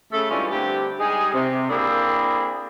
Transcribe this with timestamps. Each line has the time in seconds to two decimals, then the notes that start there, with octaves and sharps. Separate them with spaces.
0.12 C#3 A3 A4
0.30 E3 G3 G#3 C#4 D4 F4
0.50 D3 G3 A3 C4 G4
1.00 G3 G#3 D#4 G#4
1.33 C3
1.69 A#3 C4 D4 E4 G#4 A4